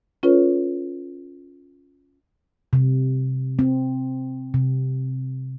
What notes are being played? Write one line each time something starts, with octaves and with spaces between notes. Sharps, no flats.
C#4 F4 A4 B4 C#5
C3
C4
C3